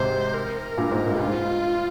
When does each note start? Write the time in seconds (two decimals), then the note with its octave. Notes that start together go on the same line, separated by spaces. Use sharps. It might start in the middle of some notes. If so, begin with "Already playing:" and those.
Already playing: G#2 C3 C5
0.35 A#4
0.77 G2 A#2
0.91 G#2
1.06 G2 A#2
1.19 G2 A#2 F4
1.27 G#2